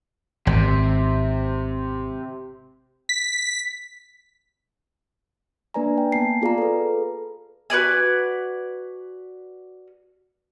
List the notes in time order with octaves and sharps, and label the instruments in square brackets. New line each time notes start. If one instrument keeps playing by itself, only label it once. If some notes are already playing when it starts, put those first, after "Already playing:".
[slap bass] G#1 [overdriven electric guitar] C3
[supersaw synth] B6
[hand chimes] A#3 D4 B4 D5 G#5 A#5
G5
A#3 B3 G#5 A5 C7
F4 G#4 D5 F5 A#5
A4 B4
[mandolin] F#4 B4 D5 G#5